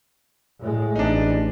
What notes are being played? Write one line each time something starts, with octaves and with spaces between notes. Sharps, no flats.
A2 G#3
A1 D4 D#4